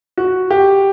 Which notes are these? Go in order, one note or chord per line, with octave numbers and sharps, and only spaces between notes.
F#4
G4